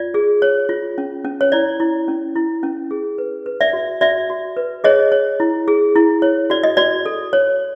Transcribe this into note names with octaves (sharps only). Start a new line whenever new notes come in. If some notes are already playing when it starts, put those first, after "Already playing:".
Already playing: F4 D5
G#4
C#5
F4
C#4
C#4
C#5
E4 D5
E4
C#4
E4
C#4
G#4
B4
B4
D5 E5
F#4
F#4 D5 E5
F#4
B4
G#4 C#5 D#5
C#5
E4
G#4
E4
C#5
F#4 D5
D#5
F#4 D5
A4
C#5